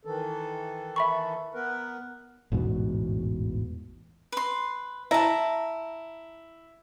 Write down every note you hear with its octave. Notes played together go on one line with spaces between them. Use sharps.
D#3 E3 A4
E5 B5 C#6
B3 A#4 B4
A1 E2 G#2 B2
B4 C6
E4 A5 A#5